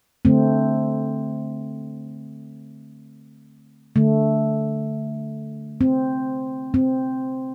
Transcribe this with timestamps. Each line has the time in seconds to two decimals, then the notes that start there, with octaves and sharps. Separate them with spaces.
0.25 D3 A3 C4
3.96 D3 A3
5.81 C4
6.74 C4